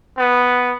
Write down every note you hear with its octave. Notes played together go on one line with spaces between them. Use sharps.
B3